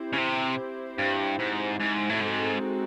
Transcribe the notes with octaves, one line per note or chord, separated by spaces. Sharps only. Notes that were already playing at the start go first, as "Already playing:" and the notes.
Already playing: C4 E4 G4 C5
C#3
C3
G2
G#2
G#2
A2
G#2 G#3 C4 D#4 F#4 A4